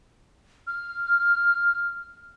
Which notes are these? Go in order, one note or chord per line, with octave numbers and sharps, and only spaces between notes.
F6